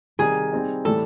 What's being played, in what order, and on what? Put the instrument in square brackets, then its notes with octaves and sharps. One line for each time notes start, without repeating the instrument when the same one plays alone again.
[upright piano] C3 D#3 G3 [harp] G#4
[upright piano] G3 C4 D#4
[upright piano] A2 E3 G3 [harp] A4